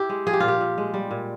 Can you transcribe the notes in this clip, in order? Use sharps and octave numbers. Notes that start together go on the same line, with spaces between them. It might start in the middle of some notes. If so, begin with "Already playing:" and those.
Already playing: E4 G4
G#3
F3 G#4
G4
A#2 F4
G4
A#2
G#3
G3
A#2